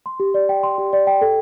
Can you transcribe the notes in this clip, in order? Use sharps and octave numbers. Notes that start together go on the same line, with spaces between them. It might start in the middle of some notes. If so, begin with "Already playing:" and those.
C6
G4
D5
G5
C6
G4
D5
G5
A4